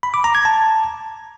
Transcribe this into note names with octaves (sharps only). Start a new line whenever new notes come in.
B5
D6
A#5
G#6
A5